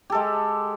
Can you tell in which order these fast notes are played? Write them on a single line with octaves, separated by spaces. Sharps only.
G4 A4 G#3